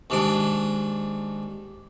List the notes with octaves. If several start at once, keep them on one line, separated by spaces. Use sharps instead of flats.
D#2 G#2 D4